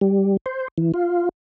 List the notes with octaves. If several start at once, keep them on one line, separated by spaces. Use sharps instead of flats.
G3
C5
E3
F4